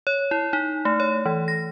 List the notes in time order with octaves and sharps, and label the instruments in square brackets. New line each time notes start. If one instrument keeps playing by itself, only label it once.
[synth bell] C#5
E4
D#4
A3
C#5
E3
A#6